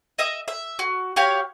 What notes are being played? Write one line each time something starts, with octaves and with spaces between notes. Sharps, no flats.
D#5 E5 D#6
E5
F#4
F#4 G4 C#5 F5